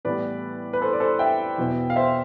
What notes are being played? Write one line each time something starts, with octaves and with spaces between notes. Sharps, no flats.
A2 E3 G3 B3 B4 D5
B4
A4 C5
D5
A4 C5
E5 G5
E2 B2 B3
F5
C5 E5